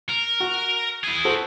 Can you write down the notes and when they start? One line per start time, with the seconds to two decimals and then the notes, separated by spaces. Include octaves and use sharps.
0.09 A#4
0.40 F#4
1.04 E4 G#4
1.25 F#4 A4 C5